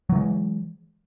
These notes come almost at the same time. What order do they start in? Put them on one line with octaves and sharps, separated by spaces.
F#3 E3 G#3